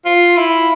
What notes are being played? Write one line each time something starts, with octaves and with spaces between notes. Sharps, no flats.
F4
E4